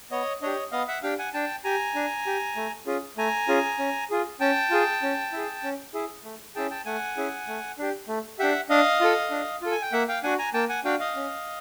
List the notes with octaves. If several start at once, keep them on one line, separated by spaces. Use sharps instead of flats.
B3 C#5 D#5
D4 G4 C#5 D#5
B3 D#5 F5
E5 F#5
D4 G4 F5 G5
F#5 G#5
D4 G5 A5
G4 G#5 A#5
D4
G4
A3
C#4 F4 G#4
A3 G#5 A#5
C#4 F4 G#4
C#4
F4 G#4
C#4 G5 A5
F4 G#4
C#4
E4 G#4
C#4
E4 G#4
A3
C#4 E4 G#4 G5 A5
G5 A5
A3 F#5 G#5
C#4 E4 G#4
A3
D4 G4
A3
D4 G4 E5 F#5
D4 D#5 F5
F4 A4
D4
F4 A4
G#5
G5
A#3 E5 F#5
F5 G5
D4 F#4 F#5 G#5
G#5 A#5
A#3 G5 A5
F#5 G#5
D4 F#4 F5 G5
D#5 F5
C#4